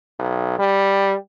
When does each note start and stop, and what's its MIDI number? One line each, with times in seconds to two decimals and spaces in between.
0.19 0.58 35
0.59 1.15 55